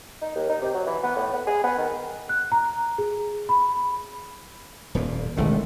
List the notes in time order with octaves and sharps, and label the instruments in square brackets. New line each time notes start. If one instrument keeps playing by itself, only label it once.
[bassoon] D#4
D#2
D#4
C3
F#3
E3
B3
A2
B3
G#4
B3
D#3
[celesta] F#6
A#5
G#4
B5
[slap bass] D#1 F2 A#2
[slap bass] E1 A1 A2 [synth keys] D#3 G#3 A3